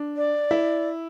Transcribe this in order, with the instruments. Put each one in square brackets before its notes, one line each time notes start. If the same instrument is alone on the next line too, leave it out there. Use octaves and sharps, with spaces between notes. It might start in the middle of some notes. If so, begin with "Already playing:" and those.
Already playing: [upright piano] D4
[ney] D5
[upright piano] E4